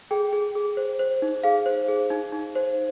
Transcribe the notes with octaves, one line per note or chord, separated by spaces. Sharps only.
G#4 G5
G#4
G#4
C5
C5
D#4
G#4 F5
C5
G#4
D#4
D#4
C5